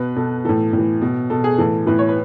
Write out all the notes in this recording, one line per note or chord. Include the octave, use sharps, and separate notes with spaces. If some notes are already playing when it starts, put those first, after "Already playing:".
Already playing: B2 B4
B2 A4
A2 E3 A4
A2
E3
B2
B2 A4
G#4
A2 E3 A4
A2 E3 B4
C#5
B4